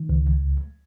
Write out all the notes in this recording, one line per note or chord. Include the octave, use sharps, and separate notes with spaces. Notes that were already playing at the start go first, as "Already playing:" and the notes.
Already playing: D#3
C#2